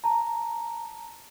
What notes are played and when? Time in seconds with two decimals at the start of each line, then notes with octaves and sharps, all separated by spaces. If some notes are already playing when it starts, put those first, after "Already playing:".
0.04 A5 A#5